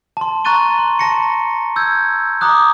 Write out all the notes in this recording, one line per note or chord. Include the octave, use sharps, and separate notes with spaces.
A5 C6
A#5 C#6 F#6 A6 D#7 G7
C6
A5 A#6 C#7
E6 G6 G#6
A#5 D6 D#6 F#6